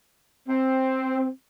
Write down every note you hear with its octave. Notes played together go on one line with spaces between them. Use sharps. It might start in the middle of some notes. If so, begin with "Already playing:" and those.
C4